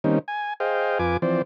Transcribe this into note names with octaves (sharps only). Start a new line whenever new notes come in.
D#3 G3 A#3 C4 C#4 D#4
G#5
G#4 C5 D#5 F5 G5
F2 F4 B4 G#5 D6
E3 F3 C4 C5 D5